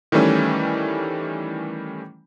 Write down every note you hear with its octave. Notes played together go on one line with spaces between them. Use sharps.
D#3 E3 G3 A3 C#4